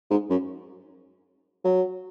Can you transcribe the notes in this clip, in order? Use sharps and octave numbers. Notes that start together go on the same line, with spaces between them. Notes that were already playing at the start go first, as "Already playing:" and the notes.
G#2
F#2
F#3